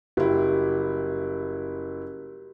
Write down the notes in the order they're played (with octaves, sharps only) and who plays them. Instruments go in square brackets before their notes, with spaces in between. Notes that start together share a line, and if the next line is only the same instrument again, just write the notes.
[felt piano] F#1 E4 [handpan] F#4 G4